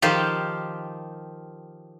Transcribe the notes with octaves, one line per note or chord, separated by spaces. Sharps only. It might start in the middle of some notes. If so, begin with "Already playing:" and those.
D#3 F3 F4 G4